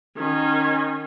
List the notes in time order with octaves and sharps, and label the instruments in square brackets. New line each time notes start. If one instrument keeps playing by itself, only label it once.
[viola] D#3 C#4